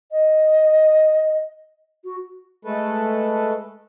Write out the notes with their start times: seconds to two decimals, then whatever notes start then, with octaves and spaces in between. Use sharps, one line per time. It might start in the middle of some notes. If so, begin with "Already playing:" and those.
0.12 D#5
2.04 F#4
2.65 G#3 A3 A4 B4